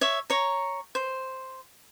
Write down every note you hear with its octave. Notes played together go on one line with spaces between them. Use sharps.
C#5 E5
C#5 A#5
C5